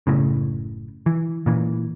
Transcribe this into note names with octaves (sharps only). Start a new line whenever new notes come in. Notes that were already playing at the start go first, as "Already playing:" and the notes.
F#1 A2 C#3
E3
A#2 E3